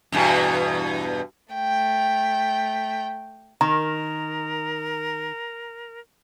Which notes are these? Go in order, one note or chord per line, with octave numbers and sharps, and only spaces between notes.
E2 G2 B2
A3 G5
D#3 A#4 A#5